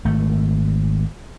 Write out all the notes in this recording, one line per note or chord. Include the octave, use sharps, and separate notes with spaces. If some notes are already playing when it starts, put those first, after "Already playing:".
G#1 A3